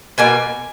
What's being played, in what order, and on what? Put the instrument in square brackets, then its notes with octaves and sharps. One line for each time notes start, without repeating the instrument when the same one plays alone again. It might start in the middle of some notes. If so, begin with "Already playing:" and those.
[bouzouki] B2 A#3 G#5